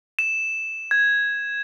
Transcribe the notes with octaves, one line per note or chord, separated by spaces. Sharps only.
E7
G#6